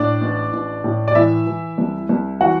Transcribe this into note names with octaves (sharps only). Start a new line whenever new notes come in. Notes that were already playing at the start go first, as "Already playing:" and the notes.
Already playing: A2 D4 D5
A1
A1
A2
D5
E3 E4 E5
E3
C2
C2
E3 F#4 F#5